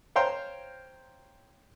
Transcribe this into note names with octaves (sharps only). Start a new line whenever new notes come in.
C5 C#5 F5 G5 A#5 C6